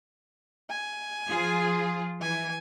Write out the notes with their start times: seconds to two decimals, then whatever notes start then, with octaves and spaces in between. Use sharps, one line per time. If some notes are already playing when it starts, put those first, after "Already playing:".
0.70 G#5
1.28 F3 F4 G#4
2.21 E3 G#5